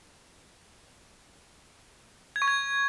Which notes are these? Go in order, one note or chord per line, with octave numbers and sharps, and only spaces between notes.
G#6
C#6
G#6